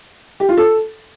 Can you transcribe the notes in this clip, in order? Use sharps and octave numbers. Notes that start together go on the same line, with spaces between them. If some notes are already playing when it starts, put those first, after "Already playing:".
G4
F4
A4